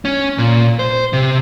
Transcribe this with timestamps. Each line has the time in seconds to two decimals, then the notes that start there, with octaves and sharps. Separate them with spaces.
0.05 C#4
0.38 A#2
0.79 C5
1.13 C3